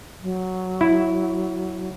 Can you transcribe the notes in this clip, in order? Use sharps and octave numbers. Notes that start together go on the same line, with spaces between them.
F#3
E4